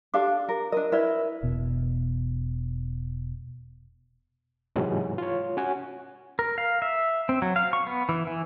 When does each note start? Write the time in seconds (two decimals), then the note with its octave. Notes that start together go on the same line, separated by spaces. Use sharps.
0.14 D4 G4 A4 F5 D6
0.49 A#4
0.72 D4 F4 A#4 D#5
0.92 E4 A#4 B4 D5
1.43 E1 B2
4.76 G#2 C3 E3 F#3 G#3
5.18 F4 C#5
5.57 C#4 F#4 G#5
6.39 A#4
6.58 F5
6.82 E5
7.29 C4
7.42 F#3
7.56 F5
7.73 C#6
7.87 B3
8.09 E3
8.27 E3